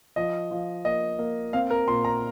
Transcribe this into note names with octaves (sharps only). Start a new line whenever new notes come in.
F3 D#5
F3
A#3 D#5
A#3
C4 F5
A#4
A#2 C6
A#5